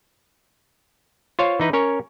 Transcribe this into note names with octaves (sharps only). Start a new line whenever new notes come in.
F4 C5 C#5 F5
E3 D#4 B4
C#4 A#4 C#5